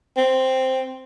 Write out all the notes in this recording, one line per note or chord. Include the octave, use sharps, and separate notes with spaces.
C4